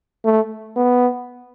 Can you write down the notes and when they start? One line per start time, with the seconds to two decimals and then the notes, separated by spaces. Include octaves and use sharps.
0.24 A3
0.76 B3